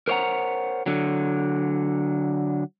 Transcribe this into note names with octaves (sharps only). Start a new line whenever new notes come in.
A#4 C5 C#5 F5 F#5 A#5
D3 F#3